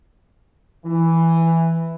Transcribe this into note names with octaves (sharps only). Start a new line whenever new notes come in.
E3